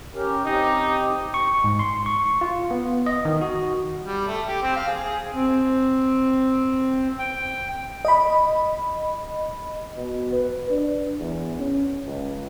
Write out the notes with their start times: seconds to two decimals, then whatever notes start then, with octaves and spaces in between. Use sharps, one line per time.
0.14 C#4 G4 A#4
0.45 C4 D#4 G4
1.34 C#6
1.64 G#2
1.79 C6
2.06 C#6
2.41 F4
2.71 B3
3.06 D#5
3.25 D#3
3.41 F#4
4.04 G3
4.27 A3
4.47 G4
4.62 C4
4.76 F5
4.88 G#4
5.03 G#4
5.35 C4
7.19 G5
8.05 D#5 B5
9.97 B2
10.32 B4
10.70 D4
11.19 E2
11.59 C#4
12.06 C#2